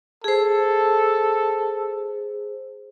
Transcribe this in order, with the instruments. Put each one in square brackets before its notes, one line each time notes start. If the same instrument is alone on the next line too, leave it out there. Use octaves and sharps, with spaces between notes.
[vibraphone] G#4 C5 [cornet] A4